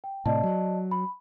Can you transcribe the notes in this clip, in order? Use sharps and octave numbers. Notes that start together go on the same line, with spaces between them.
G5
A2 C3 D5 D#5 A5
F#3
B5